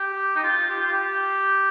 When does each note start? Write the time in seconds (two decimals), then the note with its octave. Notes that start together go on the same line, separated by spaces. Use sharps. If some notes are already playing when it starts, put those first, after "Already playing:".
Already playing: G4
0.36 D#4
0.44 F4
0.69 G4
0.81 F4
0.92 G4